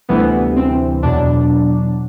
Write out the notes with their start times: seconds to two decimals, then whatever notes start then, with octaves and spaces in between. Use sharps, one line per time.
0.09 D2 C3 E3 G3 B3
0.56 C4
1.03 E2 B2 F#3 D4